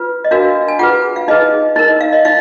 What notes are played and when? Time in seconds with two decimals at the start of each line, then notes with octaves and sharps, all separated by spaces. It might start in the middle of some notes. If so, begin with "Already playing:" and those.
Already playing: F4 B4
0.24 D#5
0.31 D4 F#4 A#4 F5
0.68 G#5
0.79 F4 G#4 B4 F#5
1.16 F5
1.28 D#4 G#4 B4 D#5
1.76 D#4 A#4
1.88 D#5
2.01 F5
2.13 D#5
2.25 D#4 F5